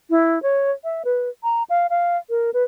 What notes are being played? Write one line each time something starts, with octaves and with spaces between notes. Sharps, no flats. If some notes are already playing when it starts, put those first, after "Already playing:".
E4
C#5
E5
B4
A#5
F5
F5
A#4
B4